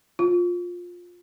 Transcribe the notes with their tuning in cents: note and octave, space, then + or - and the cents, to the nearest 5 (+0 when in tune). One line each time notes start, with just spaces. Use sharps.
F4 +15